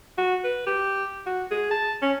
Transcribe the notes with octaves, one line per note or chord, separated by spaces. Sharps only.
F#4
B4
G4
F#4
G#4
A5
C#4